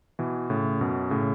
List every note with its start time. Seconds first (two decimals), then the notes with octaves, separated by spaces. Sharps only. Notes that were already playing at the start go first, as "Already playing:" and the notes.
0.19 B2 E3
0.50 A2 C#3
0.81 F#2 B2
1.11 A2 C#3